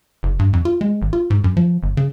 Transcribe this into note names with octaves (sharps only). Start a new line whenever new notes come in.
F#1
G2
F2
F4
G#3
G#1
F4
G#2
F#2
F3
G1
C#3